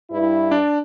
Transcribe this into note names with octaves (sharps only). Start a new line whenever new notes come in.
G2 E4
D4 D5